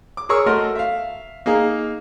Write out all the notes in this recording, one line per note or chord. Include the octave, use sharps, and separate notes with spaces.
D6
G#4 A#4 C#5 C#6 E6
A3 F#4 A#4 D#5 C6 F6
E5 F5
A#3 D#4 G#4 F5